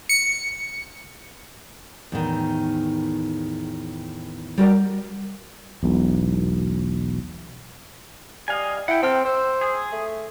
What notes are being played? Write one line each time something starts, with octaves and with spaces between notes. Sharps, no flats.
C#7
E2 A2 D#3
G3 F#4 A#4 D5
E1 B1
G3 D#5 F5 G#5
E4 F#5 G5
C4 A4 G5 F6
C5 E6
G#4
A3